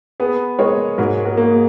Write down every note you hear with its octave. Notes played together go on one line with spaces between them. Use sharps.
B3 G#4 B4
G#3 A#4 C#5
G#2 F#4 A#4
F#4 A#4
A#3
G#4